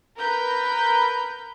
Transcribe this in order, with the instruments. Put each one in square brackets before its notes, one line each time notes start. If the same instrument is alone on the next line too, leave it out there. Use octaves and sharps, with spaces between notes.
[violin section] A#4 B4 G6